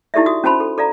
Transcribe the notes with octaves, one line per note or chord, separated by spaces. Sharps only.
D#4 E4 G4 A4 D5 E5
F#4 D#6
C#4 F#4 C5 A5 B5 C6
A4
A4 D5 F5 A#5